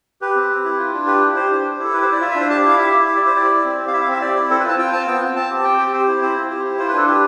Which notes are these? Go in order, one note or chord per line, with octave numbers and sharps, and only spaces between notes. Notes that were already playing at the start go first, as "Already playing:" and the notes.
G4 B4
C4
G4
E4
F4
D4
G4 B4
E4
G4 C5
D4
G4
E4 A4
G4 B4
C5
E4
D5
F4 E5
E5
D4
C5
G4 A5
E4 F5
G4 E5
E4
G4 E5
D5
E4 C5
G4 D5
E4
C4
G4
F5
E4 E5
F5
C4 E5
G4 D5
E4
C4 A4
B4
F4 A5
F4 G5
C4 A5
B3 G5
F4
C4 A5
G4
A5
C4 G5
G4
G4 C5
E4
C4 C5
F4
G4
E4
F4 C5
B4
D4 A4
G4 B4